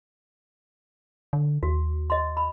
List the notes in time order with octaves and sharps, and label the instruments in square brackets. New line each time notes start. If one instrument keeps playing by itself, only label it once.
[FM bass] D3
[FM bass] D#2 [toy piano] F#4
[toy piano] D#5 C6
B5